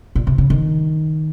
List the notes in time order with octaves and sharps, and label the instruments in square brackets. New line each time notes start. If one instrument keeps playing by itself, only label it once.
[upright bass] A#2
C3
C#3
D#3